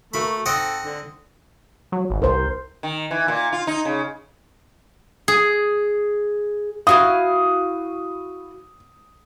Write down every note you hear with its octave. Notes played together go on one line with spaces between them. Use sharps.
A3 A#3 F#4 A#4 B5
G#2 C4 A4 D#5 F#5 G5
D3
F#3
G#1
C2 A#4 C5
D#3
E3
A#2
F4
D#4
C#3
G#4
E4 F#4 F5 D#6